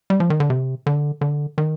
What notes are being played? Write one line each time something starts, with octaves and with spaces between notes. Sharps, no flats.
G3
F3
D#3
D3
C3
D3
D3
D#3